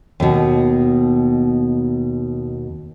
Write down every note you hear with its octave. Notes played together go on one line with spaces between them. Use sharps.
D#2 B2